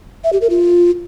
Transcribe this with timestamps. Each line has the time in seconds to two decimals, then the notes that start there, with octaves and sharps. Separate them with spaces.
0.24 E5
0.33 G4
0.41 A#4
0.50 F4